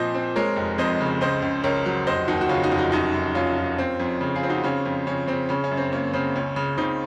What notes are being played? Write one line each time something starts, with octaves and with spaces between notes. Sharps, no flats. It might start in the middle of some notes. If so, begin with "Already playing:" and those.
Already playing: A#2 F3 C4 C5 D#5
C4
G#3 A#4 C#5
F1
F2 C5 D#5
C#3
C#2 C5 D#5
C#2
C#2 A#4 C#5
F#3
F1 C5 D#5
D#2 D#4 F#4
F#4
C#3 C#4 F4
D#4 F#4
F1
D#4 F#4
F#2 D#4 F#4
F#2
F#2 C#4 F4
F3
C4
F2
C#3
F4 G#4
C4
D#4 F#4
C#3 C#4 F4
F2
C#3 C#4
C#3 C4
C#3 C#4
C#4
F#2
C4
A#3 C#4
C#3 C4
C#2 C#4
C#3
C#3 C4 D#4